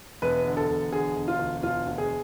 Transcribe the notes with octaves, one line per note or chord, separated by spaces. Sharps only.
E1 B4
D3
A4
E1
D3 G#4
E1
F4
D2
E1 F4
D2
G#4